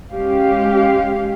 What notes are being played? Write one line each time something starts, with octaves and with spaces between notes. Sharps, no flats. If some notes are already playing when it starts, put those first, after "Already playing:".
G#3 C#4 G4 F5